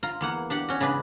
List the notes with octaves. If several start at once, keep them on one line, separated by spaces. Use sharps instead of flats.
F4 A#5
E2 A#3 F#5
D4 G4 F#5
C#4 F#4
C#3 G#3 D4 B4